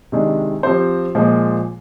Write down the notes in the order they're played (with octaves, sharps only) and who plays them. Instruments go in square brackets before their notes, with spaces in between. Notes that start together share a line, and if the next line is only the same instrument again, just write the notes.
[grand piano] C3 D#3 G#3 D4
F3 C4 G4 C5
A#2 F3 G#3